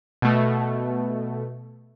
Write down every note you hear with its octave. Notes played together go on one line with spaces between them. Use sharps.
B2 A3